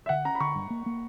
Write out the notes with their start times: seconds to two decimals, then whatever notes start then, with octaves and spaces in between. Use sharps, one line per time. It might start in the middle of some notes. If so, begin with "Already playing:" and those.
0.06 E5
0.09 D3 F#5
0.25 C#4 A#5
0.35 B5
0.40 D3 C#6
0.55 G2
0.70 A#3
0.86 A#3